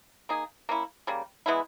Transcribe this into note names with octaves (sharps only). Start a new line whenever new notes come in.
A#3 D#4 G#4
A#3 C#4 E4
C#3 G3 A#3
E3 G#3 B3 E4